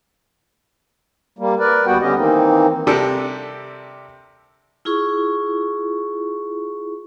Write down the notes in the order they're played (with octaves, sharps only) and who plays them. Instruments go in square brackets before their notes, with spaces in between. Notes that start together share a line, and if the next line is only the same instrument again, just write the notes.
[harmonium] G3 A#3
A#4 B4 D5
D#2 G3 B3 F#4 F#5 G5
D3 G3 B3 C#4 G4 D#5
D#3 E3 A#3 C4 D#4
[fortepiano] C3 G3 D4 A4 A#4
[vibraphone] E4 F4 G#4 C#6